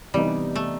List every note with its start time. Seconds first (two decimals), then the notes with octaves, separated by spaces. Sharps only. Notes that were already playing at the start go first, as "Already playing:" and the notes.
0.14 C3 E3 G3 B3 D#4
0.56 A3